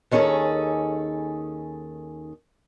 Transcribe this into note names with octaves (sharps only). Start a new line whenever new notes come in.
D#2 D#3 C#4 G#4 A4